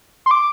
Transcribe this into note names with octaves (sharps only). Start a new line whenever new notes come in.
C6
D6